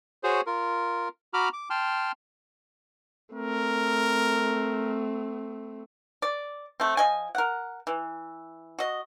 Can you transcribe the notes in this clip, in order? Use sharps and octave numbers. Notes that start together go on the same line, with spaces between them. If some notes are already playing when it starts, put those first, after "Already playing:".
F#4 G#4 C5 C#5
F4 A#4
F#4 A#5 B5 D6 F6
D6
G5 A5 C6 F6
A3 C4 A#4
D5
A3 C4
F3 D#5 G#5
A#4 F#5
E3
F#4 D#5